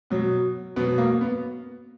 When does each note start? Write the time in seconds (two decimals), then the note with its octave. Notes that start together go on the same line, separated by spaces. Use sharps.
0.10 B2 F#3
0.76 B2 B3
0.79 F#3
0.98 A#3
1.21 B3